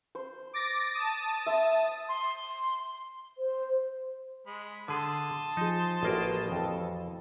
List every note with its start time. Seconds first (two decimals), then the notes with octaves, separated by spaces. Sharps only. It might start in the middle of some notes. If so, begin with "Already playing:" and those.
0.15 C5
0.53 D6 A6 A#6
0.95 A5 D#6
1.46 E5 C6
2.09 C6
3.38 C5
4.47 G#3 B5
4.88 D3 G#4 A5 C6 D#6
5.57 F3 D#4 G#4
6.03 A1 E3 A#3 E4 F#4 G5
6.52 F2 E3 A4